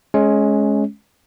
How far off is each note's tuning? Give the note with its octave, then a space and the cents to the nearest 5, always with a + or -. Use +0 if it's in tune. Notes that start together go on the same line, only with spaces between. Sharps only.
G#3 +20 C#4 +0